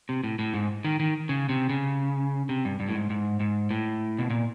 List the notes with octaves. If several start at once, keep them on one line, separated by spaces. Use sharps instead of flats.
C3
A2
A2
G#2
D#3
D#3
C#3
C3
C#3
C3
G2
G2
A2
G#2
G#2
G#2
A2
B2
A#2